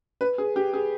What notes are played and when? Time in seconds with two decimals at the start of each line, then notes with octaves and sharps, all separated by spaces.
0.21 B4
0.38 G#4
0.56 G4
0.73 G#4